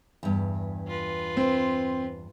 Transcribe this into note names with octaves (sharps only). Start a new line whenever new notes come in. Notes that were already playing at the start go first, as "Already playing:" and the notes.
E2 G2
F4 B4
C4